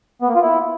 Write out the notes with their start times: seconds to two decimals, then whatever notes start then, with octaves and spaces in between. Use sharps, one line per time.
0.22 B3
0.29 A#3
0.36 F4
0.42 E4